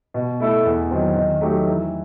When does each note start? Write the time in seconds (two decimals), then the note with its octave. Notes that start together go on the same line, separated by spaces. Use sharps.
0.14 B2
0.40 A3 E4 A4
0.65 E2
0.91 D#3 F#3 C4
1.15 D#3
1.41 F#3 A3 D#4 G4
1.66 E3